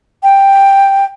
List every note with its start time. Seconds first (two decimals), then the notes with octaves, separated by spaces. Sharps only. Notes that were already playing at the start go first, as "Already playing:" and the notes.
0.23 G5